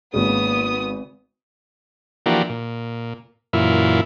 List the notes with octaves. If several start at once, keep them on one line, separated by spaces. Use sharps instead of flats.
G#1 C#3 A#3 B3 D#6
E3 F3 A#3 D4 F#4 G4
A#2
F#2 A#2 E3 E4 F4